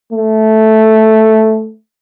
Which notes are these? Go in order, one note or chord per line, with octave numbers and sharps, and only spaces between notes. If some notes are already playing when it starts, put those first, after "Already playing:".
A3